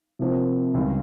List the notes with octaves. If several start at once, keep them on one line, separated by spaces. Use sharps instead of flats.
C3 F3 A#3
C#2 C#3 G3